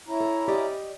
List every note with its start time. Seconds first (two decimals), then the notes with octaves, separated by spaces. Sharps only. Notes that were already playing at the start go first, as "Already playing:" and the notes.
0.08 C#4 E4 A#5
0.20 A4
0.48 G4 D5 D#5